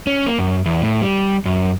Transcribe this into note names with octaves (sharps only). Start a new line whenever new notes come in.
C#4
A#3
F#2
E2
A2
G3
F#2